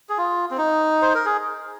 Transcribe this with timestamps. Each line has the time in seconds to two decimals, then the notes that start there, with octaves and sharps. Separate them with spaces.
0.09 G#4
0.18 F4
0.51 C4
0.58 D#4
1.02 C5
1.14 A#4
1.25 G#4